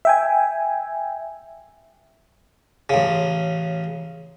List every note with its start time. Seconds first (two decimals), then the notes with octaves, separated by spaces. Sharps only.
0.05 E5 G5 G#5
2.90 A1 C#3